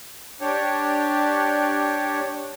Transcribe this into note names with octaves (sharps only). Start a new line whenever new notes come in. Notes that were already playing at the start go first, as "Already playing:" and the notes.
D4 G4 C#5